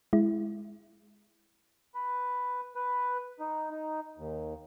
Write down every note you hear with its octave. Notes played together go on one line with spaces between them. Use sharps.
G#3 E4
B4
B4
D#4
D#4
D#2